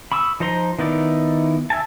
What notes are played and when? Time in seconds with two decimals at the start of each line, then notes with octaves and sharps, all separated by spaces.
0.12 B5 C#6 D#6 E6
0.40 F3 D#4 C5 A#5 C6
0.79 D#3 B3 D#4 E4 D5
1.70 E5 F5 G#5 A5